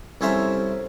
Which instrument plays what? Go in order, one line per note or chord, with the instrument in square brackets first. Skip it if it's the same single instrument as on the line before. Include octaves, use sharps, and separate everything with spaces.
[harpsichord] C2 C#4 A4 C5 E5 A#5